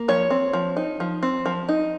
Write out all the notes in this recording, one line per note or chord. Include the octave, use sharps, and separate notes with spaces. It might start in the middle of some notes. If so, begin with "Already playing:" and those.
Already playing: A#3
F3 C#5
C4
F3
D#4
F3
C4
F3
D#4